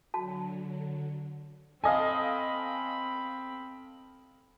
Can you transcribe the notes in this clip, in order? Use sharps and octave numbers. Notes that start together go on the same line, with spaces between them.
D3 F#3 F#4 A5
C4 A4 D#5 F5 G#5 B5